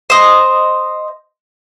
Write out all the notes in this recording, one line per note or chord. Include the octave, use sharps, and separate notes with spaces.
C5 D#5